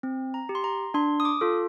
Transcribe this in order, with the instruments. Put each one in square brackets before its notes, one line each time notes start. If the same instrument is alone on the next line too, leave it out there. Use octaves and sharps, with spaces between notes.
[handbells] C4
A#5
G4
C6
A#5
D4 C6
D#6
D6
F4 A4